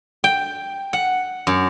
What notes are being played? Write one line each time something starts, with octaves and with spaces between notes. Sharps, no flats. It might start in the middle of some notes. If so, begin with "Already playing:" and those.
G5
F#5
F#2